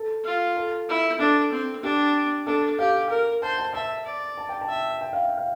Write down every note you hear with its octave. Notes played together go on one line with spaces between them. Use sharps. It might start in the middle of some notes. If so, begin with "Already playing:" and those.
Already playing: A4
F4
A4
E4
D4 A4
C4
D4 G4
D4 A4
G4 F5
A#4
C5 A5
A5
E5 A5
D5
A5
G5
A5
E5
G5
F5
E5
F5